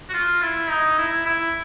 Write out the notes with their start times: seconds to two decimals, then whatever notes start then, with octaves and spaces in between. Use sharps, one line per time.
0.09 F#4
0.13 F4
0.42 E4
0.70 D#4
0.99 E4
1.26 E4